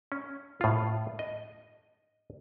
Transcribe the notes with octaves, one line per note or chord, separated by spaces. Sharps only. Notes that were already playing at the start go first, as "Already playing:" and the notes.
C#4
A2 F4
D#5